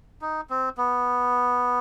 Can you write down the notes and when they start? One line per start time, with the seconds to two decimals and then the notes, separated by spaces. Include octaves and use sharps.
0.22 D#4
0.50 C4
0.78 B3